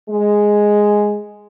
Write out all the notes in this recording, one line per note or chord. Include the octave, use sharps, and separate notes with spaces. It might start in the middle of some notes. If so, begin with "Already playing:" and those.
G#3